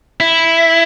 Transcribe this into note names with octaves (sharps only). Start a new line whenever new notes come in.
E4